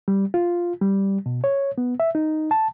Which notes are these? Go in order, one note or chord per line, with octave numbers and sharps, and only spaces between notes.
G3
F4
G3
B2
C#5
B3
E5
D#4
A5